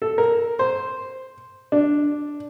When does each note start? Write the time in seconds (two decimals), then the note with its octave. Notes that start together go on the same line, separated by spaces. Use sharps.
0.02 A4
0.18 A#4
0.59 C5
1.72 D4